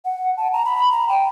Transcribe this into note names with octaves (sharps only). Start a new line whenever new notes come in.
F#5
A5
A#5
B5
A#5
G5